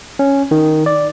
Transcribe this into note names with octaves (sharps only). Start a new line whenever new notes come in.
C#4
D#3
D5